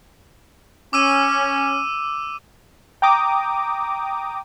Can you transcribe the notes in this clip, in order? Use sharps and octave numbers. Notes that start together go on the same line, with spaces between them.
C#4 D6 E6 D#7
G5 A#5 D6 D#6